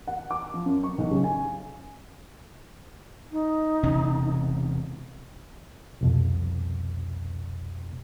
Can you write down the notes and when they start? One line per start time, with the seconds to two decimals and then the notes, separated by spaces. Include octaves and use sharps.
0.07 F#5
0.31 D6
0.54 F3
0.66 F#2
0.84 C#6
0.98 B1
1.11 C#3
1.24 G#5
3.32 D#4
3.83 E1 C3 C#4
6.01 C2 F2 B2